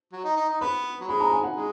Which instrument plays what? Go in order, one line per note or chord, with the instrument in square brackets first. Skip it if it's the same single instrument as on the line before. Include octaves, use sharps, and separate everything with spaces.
[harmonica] F#3
D#4
D#4
D#4
[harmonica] B3 [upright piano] B5
[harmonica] F#3
[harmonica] G#3 [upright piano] B5
[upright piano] A#5
G#5
F#5
[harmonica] G#3